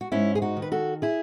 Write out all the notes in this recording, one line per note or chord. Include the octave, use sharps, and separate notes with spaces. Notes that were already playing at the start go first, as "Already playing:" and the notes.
F#4
G#2 C#4 E4
G#4
D#4 F#4
D#3
B4
F#4 A4
E4 G#4